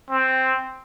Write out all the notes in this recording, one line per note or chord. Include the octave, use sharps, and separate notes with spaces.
C4